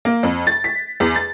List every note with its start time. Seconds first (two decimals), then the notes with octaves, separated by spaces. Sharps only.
0.05 A#3
0.23 F2
0.47 A6
0.64 B6
1.00 E2
1.15 A6